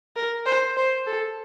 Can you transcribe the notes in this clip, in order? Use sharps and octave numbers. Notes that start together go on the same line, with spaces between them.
A#4
C5
C5
A4